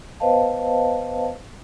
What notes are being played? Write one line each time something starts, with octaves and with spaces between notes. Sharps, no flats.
B3 B4 C5 D#5 F5 A5